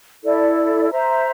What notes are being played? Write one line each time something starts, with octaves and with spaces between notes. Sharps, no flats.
E4 A4 D5
C5 E5 A#5